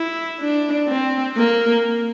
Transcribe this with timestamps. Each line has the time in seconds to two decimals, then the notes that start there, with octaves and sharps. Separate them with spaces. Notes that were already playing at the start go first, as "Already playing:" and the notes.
Already playing: E4
0.40 D4
0.88 C4
1.37 A#3